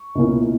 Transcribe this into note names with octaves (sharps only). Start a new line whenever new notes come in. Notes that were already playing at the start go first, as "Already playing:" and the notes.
Already playing: C#6
C#2 B2 A#3 C#4 E4